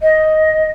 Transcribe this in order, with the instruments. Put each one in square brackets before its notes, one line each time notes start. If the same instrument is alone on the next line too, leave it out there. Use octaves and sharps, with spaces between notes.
[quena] D#5